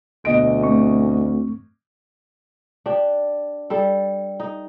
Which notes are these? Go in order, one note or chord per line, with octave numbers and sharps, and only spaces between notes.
D2 B2 D#5 D7
A3 C4 C#6
D4 G4
G3 A4
D#4